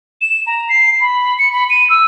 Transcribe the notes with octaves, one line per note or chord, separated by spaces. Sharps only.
E7
A#5
C7
B5
C#7
B5
D#7
E6